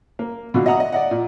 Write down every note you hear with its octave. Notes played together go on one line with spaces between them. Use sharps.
A#3
B2 D3 F4 F#4
D#5 E5 F#5 A#5 D#6
D#5
D5 D#5 F#5
A#2